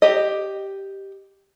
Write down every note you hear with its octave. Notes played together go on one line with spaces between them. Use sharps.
G4 D#5